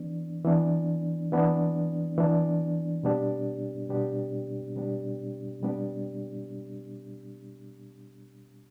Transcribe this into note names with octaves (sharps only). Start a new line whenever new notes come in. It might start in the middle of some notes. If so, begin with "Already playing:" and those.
Already playing: E3 B3 D4
E3 B3 D4
E3 B3 D4
E3 B3 D4
B2 G3 B3 D4 G4
B2 G3 B3 D4 G4
B2 G3 B3 D4 G4
B2 G3 B3 D4 G4